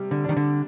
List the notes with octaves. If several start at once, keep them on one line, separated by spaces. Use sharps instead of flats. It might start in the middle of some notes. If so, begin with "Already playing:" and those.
Already playing: C3 G3
D3
D#3 D4
D3